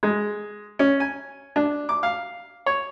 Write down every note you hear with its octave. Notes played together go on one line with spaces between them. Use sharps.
G#3
C#4
G#5
D4
D6
F5
C#5